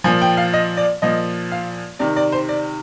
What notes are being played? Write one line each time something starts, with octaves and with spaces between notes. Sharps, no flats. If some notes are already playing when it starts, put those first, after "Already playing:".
A#2 F3 G#5
G5
F5
D#5
D5
A#2 F3 D#5
F5
C3 D#3 D5
D5
C5
D5